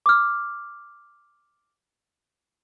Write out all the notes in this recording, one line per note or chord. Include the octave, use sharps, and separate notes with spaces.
D6 F6